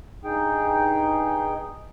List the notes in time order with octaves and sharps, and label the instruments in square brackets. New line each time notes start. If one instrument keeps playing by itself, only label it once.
[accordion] G2 D#4 G#4 G5